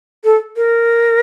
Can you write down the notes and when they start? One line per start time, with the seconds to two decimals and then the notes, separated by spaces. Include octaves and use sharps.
0.24 A4
0.57 A#4